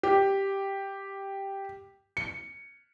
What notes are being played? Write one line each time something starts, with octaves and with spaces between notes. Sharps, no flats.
G4
C#7